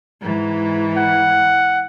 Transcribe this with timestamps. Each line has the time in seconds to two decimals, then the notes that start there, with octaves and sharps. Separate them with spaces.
0.22 G#2 E3
0.97 F#5